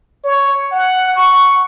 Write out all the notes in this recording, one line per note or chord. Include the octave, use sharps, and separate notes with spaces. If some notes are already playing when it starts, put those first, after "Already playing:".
C#5
F#5
C#6